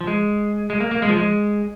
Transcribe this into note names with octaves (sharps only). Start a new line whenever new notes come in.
F3
G#3
G#3
A#3
A#3
G#3
F3
G#3